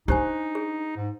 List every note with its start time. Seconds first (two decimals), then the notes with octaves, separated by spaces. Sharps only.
0.08 D4 D#4 G4 C5 G#5
0.55 G#4
0.96 G#2